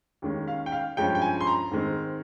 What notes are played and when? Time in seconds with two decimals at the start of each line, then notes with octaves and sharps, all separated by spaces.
0.22 D#2 D#3 G#3 C#4
0.48 F5
0.66 G5
0.72 F5
0.97 G2 F3 G#3 C#4 G5
1.15 G5
1.22 G#5
1.41 C6
1.47 A#5
1.71 G#2 D#3 G#3 C4